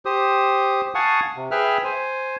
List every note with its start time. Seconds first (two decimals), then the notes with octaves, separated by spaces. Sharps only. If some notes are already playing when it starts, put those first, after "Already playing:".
0.05 G4 C5 D#6
0.95 F5 F#5 G#5 A5 C#6 D#6
1.36 C3
1.51 G#4 B4 E5 G5 F6 F#6
1.84 C5 G#5